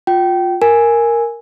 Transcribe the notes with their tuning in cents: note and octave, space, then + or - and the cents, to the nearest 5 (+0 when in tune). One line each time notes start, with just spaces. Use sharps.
F4 +20 G5 -25
A#4 +0 G#5 +0